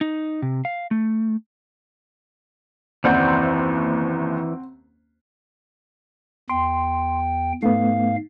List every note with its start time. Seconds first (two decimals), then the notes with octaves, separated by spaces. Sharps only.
0.01 D#4
0.42 C3
0.65 F5
0.91 A3
3.04 F#1 D#2 E3 C4 D5 F#5 G6
6.50 E2 G5 C6
7.63 G#2 A3 B3 F5